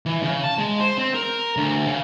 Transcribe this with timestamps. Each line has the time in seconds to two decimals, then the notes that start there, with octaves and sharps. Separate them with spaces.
0.06 E3
0.23 C#3
0.44 A5
0.58 G#3
0.80 C5
0.98 C4
1.14 A#4
1.57 D2
1.87 C#3